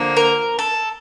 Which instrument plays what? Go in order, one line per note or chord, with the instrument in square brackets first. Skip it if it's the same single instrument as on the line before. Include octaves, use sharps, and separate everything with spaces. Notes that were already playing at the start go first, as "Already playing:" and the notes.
Already playing: [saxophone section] D3 F3 A#3
[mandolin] A#4
A4